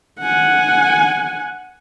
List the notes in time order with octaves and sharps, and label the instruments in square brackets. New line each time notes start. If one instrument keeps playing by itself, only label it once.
[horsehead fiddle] F#5 G#5